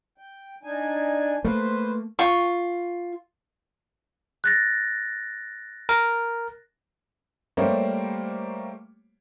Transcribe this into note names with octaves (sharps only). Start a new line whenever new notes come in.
G5
D4 D#4 G#5
A3 A#3 B4 C5
F4 C#6
F#6 A6 A#6
A#4
G3 A3 A#3 G4 C5 C#5